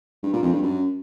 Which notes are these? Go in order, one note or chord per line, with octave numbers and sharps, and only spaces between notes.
G2
A#2
F2
G2
F#2